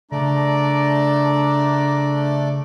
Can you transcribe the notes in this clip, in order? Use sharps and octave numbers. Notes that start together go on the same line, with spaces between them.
C#3 A3 D4 D5 A#5